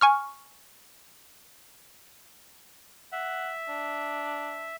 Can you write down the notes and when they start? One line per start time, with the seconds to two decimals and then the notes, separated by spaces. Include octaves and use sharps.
0.01 G#5 C#6 F6
3.12 E5 F#5
3.69 D4